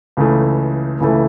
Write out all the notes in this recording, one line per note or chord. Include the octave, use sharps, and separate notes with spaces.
C#2 C#3 E3 A3
C#2 C#3 E3 A3